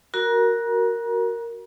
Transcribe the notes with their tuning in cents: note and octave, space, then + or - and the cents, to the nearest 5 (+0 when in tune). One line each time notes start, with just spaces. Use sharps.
F#4 +0 A#4 -5 A#5 +35